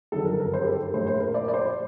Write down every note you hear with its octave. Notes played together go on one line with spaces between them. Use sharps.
G1 F#2 D#3 A4
A#4
A#4
C5
G4
A4
A#4
A#1 A2 C5
C5
A#4
D5
D5
C5